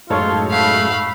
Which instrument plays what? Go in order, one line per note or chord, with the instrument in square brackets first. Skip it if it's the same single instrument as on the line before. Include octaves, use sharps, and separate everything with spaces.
[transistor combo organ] F#2 A2 G#3 [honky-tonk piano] D#4 A4 C#5 [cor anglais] F4
[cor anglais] A3 [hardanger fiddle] F5 B5